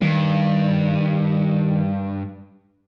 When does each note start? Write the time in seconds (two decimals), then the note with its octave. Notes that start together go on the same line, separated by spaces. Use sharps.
0.02 G2 D#3